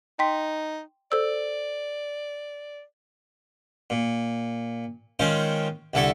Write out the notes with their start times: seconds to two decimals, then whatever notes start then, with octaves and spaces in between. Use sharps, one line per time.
0.19 D#4 G5 C6 B6
1.12 A4 C5 D5 E6
3.90 A#2
5.19 D#3 G#3 C#4 F4 C5
5.94 C2 D3 E4 A4 C#6